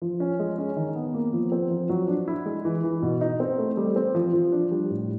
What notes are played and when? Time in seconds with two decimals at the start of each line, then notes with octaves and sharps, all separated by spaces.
0.02 F3
0.20 C#4
0.40 G#3
0.58 C#4
0.77 D#3
0.95 B3
1.14 A#3
1.33 F3
1.52 C4
1.71 F3
1.89 F#3
2.08 D4
2.28 E4
2.46 G#3
2.65 E3
2.83 E3
3.02 B2
3.21 D#4
3.40 C4
3.58 A3
3.77 G3
3.96 C4
4.15 F3
4.33 F3
4.52 D4
4.71 G3
4.90 A2